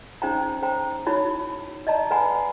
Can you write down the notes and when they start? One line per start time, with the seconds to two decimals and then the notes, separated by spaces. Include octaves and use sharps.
0.22 C#4 D#4 C5 G5 A#5
0.62 C5 G5 A#5
1.07 D#4 E4 F#4 C#5 B5
1.87 D5 D#5 A5 A#5
2.11 B4 F#5 G#5 A#5 B5